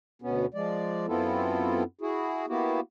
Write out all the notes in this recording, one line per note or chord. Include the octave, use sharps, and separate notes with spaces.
D2 B2 B3 C#4
F3 G#3 D5
F#2 B3 C4 E4 F4 A4
E4 F#4 G#4
A#3 B3 E4 F#4 G4